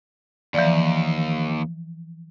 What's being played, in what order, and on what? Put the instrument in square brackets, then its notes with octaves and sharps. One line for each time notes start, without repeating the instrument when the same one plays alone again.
[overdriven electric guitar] D#2 [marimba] E3 F3 D5